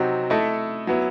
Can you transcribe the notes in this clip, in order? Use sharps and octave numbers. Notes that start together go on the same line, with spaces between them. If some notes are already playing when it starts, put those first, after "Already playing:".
Already playing: C3 F#3 C4 D#4 F#4
A3 E4 A4 D#5
F#3 B3 E4